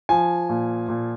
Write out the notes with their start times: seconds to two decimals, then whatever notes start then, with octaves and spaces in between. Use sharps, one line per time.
0.09 F3 G#5
0.49 A#2
0.89 A#2